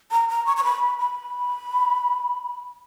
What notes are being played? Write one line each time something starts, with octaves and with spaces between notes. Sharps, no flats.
A#5
A#5
C#6
C#6
B5
B5